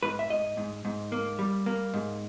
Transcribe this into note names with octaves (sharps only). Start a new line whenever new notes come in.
G#2 B4
E5
G#2 D#5
G#2
G#2
A#3
G3
A#3
G#2